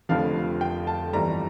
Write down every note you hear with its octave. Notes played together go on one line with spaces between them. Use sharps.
F1 F2 D3 F3 F5
G5
A5
G1 F2 E3 G3 A#5